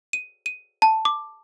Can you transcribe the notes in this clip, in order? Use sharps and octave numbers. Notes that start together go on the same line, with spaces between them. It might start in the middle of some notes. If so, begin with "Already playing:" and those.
D#7
D#7
A5
D6